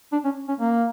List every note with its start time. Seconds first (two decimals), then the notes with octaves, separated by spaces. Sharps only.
0.12 D4
0.24 C#4
0.48 C#4
0.60 A#3